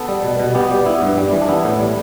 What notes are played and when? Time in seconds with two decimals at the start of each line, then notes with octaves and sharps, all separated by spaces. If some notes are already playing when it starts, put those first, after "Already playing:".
Already playing: B3 A4
0.08 G3
0.24 B2
0.40 B2
0.55 B3 G4
0.70 G3 G4
0.86 B3 E4
1.02 G2
1.18 G3
1.33 E3
1.42 D4
1.49 B3 E4
1.64 A2
1.80 G3